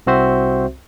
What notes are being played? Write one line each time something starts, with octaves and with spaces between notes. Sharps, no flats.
C2 C4 F#4 C5 E5